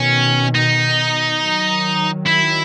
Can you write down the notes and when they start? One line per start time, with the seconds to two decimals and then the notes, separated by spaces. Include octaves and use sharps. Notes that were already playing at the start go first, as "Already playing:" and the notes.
Already playing: B2 D#3 C#4
0.55 D#4
1.41 D#3 F#3
2.27 E4